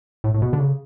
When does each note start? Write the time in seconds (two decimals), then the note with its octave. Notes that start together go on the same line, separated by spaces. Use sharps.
0.24 A2
0.34 A2
0.42 B2
0.53 D3
0.59 C#3